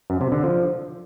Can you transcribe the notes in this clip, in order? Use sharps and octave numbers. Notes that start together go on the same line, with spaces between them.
F#2
C3
D3
F3